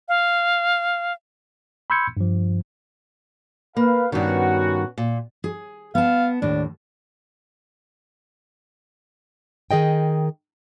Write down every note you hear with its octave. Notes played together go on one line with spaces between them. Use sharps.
F5
B5 C6 E6 G6 G#6 C#7
G2 F3
A#3 B4 F5
G2 D#3 B3 C#4 F#4
A#2
G#4
B3 F5 A5
D#2 A2 D4
D#3 G#4 D#5 G5